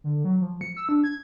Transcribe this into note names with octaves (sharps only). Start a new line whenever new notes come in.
D3
F#3
F3
C#7
E6
D4
G#6